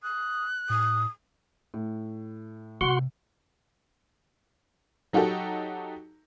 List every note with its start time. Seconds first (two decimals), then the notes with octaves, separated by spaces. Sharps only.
0.03 D#6 F#6
0.70 A2 D#6
1.74 A2
2.81 C3 F#4 F#5 C6
5.13 F#3 D#4 F#4 G4 A4